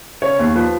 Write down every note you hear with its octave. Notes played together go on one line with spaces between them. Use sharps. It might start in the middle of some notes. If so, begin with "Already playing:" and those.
C#3 C#5
D#2
F3 B4